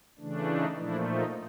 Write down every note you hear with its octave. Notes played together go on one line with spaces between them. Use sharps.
C#3 E3 A3 D4
D#4
A#2 F3 A3 D4 E4
D#4